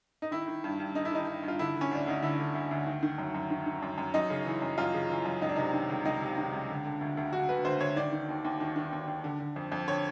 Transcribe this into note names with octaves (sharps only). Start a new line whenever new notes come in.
D#4
D#3 E4
D#3
G2
G2
D#3 D#4
E4
D#3 D#4
G2
G2
F4
D3 E4
D3
C#4
D2 D4
D2 D#4
D3 E4
D3
D2
D2
D#3
D#3
F#2
F#2
D#3
D#3
F#2
F#2
F#2 D#4
C#3
E3
F#2
F#2 F4
C#3
E3
F#2
C#2 D#4
D4
C3 D#4
D#3
C#2
C#2 D#4
C3
D#3
C#2
D3
D3
D2
D2
D3 F#4
D3 B4
D2 C5
D2 C#5
D#3 D5
D#3
D#2
D#2
D#3
D#3
D#2
D#2
D3
D3
F2
F2
D3 C#5